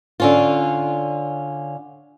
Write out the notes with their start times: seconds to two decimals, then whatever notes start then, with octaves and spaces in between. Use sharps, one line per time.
0.20 D3 C#4 F4